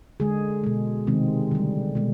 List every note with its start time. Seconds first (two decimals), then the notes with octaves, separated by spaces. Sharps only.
0.20 D3 G#3 G#4
0.64 B2 G#3
1.07 C3 D#3 G#3 C4
1.51 D3 G3
1.95 B2 G#3